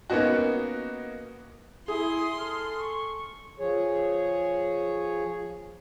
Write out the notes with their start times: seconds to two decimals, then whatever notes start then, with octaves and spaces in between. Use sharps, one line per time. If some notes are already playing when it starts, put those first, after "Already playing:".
0.10 A#3 B3 C#4 D#4 F#4
1.88 E4 G#4 C6 D#6
2.38 A4 F6
2.78 C#6
3.59 F3 G#4 C#5